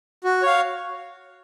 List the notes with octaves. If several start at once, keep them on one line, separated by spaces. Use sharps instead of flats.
F#4
C#5 F5